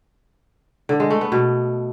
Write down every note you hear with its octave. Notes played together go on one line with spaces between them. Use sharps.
D3
G#3
A3
B3
B2